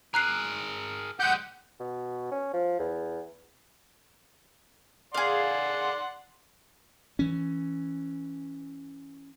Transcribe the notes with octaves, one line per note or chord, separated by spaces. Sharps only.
G#4 A#4 A#5 F#6 C7
G#3 G4 F#5 G6
B2
C#4
F3
E2
G#4 D5 F5 F#5 C6
E3 C#4